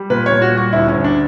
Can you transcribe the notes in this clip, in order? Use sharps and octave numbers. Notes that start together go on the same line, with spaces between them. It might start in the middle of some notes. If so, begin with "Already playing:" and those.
Already playing: G3
A#2 B4
A#2 C#5
F#4
G3
F#4
D2 E4
C#4
D2
D4